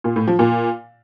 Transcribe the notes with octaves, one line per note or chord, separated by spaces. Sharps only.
A#2
A2
F3
A#2